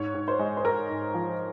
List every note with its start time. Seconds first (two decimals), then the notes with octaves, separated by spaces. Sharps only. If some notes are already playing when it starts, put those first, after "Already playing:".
Already playing: G#2 C#5
0.14 G#2
0.28 C5
0.39 G#3
0.57 C5
0.64 G#3 A#4
0.89 G#2
1.14 F3